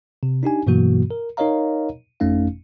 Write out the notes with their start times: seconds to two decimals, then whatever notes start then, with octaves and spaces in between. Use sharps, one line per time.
0.23 C3
0.43 D4 D#4 G4 G#5
0.67 G2 B2 E3 F#3 A#3 F#4
1.11 A#4
1.37 D#4 A#4 C#5 D#5 F5 A#5
2.20 G1 F2 A3 C#4 D#4 F5